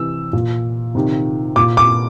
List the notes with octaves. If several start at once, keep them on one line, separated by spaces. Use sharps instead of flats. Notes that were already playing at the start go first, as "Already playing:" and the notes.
Already playing: C3 E3 E6
A#2
C3 D#3
A#2 D6
D6